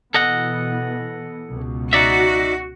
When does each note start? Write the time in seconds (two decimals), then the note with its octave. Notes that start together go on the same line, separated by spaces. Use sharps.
0.14 B2 E3 B3 A4 D#5 F#5
1.50 C#2 B2
1.93 D#4 F#4 D5 E5